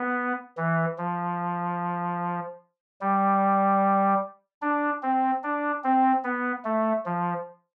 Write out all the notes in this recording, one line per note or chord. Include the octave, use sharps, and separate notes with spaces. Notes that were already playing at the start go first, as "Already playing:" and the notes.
Already playing: B3
E3
F3
G3
D4
C4
D4
C4
B3
A3
F3